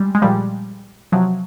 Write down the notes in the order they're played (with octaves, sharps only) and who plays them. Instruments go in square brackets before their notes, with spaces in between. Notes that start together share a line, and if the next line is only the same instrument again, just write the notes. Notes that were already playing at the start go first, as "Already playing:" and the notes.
Already playing: [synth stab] G3 G#3
G#3
A#2 F3 G3
C3 F3 F#3